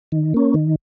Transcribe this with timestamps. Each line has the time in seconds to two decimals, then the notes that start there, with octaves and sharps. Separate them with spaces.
0.12 D#3
0.34 A#3 C#4
0.54 D#3